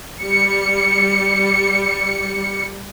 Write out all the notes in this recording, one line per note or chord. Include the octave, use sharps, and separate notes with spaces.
G3 C#7